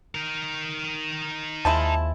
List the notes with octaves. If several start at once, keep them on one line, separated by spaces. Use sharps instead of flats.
D#4 A#4
D#2 F3 G#3 E4 A5